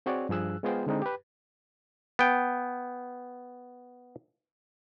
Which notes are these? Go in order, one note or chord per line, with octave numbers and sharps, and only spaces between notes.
C4 F#4 G#4 C#5 D5
G2 F3 G#4 E6 F#6
G#3 B3 F4 G#4 C5 G5
D3 G#3 C4 D#4
G4 B4
B3 G5